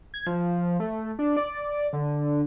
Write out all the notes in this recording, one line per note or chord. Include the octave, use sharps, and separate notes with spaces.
G#6
F3
A3
D4
D5
D3